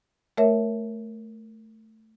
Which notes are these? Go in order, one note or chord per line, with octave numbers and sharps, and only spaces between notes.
A3 A#4 C#5 E5